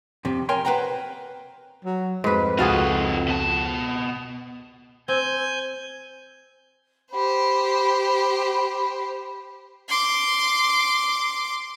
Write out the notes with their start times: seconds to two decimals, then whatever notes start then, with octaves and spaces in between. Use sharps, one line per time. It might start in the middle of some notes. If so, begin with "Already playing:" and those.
0.25 F2 C3
0.49 A#4 C#5 G5 G#5 C6
0.65 B4 C5 F#5 G5 A#5
1.85 F#3
2.24 F2 G#2 B4
2.59 C#2 D#4 F4 F#4 G#4 A4 F5
3.28 B2 A5
5.08 C4 G#5 G6
7.12 G4 C5 B5
9.89 C6 D6